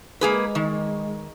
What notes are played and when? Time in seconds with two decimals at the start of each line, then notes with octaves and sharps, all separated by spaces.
0.21 G#3 A#3 G#4 B4
0.55 D#3